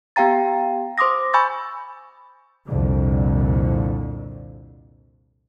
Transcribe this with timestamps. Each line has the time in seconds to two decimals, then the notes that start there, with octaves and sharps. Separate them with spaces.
0.16 B3 G4 F5 G5 A#5 A6
0.98 C5 C6 D6 D#6 A#6
1.34 G#5 B5 C#6 E6 G6 A6
2.66 C2 F2 A#2 D3